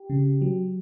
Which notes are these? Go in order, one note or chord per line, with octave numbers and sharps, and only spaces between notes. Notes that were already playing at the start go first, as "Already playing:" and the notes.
Already playing: G4
C#3
F#3